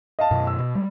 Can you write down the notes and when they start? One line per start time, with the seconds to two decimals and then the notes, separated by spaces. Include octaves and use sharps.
0.19 D#5 F5 A5
0.31 F#2 B2
0.47 E6
0.59 B2
0.75 G3 G#3